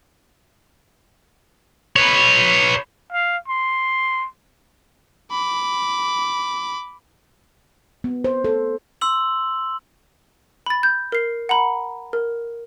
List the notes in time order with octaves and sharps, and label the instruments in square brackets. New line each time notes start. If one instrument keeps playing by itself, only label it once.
[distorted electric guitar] B4 C#5
[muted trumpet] F5
C6
[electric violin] B5 D6
[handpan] B3
C5
A4
[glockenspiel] C6 E6 F#7
[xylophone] B5 A6
G6
A#4 C7
F#5 A#5 B5
A#4